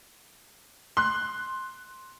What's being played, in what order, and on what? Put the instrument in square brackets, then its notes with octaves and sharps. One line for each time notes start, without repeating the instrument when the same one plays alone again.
[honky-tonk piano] C6 F#6